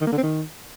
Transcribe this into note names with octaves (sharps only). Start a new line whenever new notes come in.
D#3
A#3
D3
C4
D#3